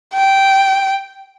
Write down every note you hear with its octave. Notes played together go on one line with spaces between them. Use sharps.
G5